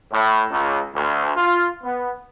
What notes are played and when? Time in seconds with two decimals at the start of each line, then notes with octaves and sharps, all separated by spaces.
0.13 A2
0.51 C#2
0.96 D2
1.36 F4
1.84 B3